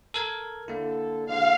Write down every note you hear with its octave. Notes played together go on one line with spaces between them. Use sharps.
A4 A#4 G#6
D3 A#3 E4 A4
G#2 B2 D3 F5